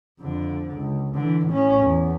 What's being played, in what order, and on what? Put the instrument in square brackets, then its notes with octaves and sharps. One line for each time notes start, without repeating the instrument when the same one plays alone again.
[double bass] F2 D3
C#2
D3 E3
A2 C#4
E2